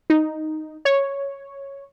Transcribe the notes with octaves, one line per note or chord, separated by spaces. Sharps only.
D#4
C#5